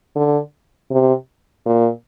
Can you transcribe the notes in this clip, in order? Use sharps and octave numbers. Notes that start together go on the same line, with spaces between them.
D3
C3
A#2